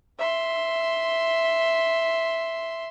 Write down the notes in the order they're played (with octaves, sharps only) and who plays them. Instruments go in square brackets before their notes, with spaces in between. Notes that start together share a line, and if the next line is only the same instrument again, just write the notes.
[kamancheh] E5 C6